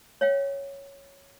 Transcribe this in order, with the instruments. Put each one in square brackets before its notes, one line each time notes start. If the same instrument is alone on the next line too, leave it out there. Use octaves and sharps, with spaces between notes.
[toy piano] C#5 F5 G5